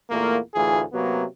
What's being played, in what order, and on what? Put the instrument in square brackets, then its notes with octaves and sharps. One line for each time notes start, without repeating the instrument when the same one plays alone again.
[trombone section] E2 A#2 A3 A#3
D2 A2 E3 F4 G#4
C3 F#3 A#3 B3